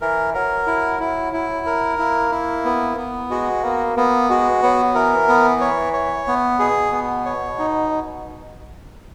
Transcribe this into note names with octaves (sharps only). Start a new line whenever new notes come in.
E3 A#4
F#3 A#4
E4
E4
E4
A#4
A#3 E4
E4
B3
B3
G#3 F#4
A#3 B3
A#3 B3
G#3 F#4
F#3 B3
E3 A#4
B3
C#5
C#5
B3
B2 G#4
B3
C#5
D#4